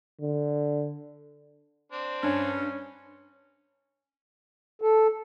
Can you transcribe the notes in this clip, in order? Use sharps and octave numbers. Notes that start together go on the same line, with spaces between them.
D3
C4 D4
G2 C#4
A4